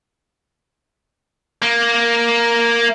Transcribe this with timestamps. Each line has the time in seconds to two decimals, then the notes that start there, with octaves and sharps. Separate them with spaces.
1.62 A#3